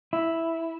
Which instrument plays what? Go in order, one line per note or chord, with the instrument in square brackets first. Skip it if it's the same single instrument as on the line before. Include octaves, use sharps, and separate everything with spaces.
[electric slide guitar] E4